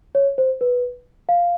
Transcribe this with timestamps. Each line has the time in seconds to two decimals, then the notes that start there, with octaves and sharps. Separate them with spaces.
0.15 C#5
0.38 C5
0.61 B4
1.29 F5